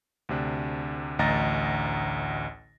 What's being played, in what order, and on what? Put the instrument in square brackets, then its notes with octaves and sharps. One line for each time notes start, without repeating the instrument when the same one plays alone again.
[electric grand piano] D2 C3 D4
A1 D2 D#5 A#5 A6 A#6